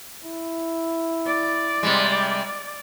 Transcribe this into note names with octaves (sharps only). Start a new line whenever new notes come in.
E4
D5
C3 G3 G#3